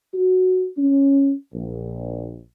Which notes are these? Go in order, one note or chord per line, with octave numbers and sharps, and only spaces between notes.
F#4
C#4
A#1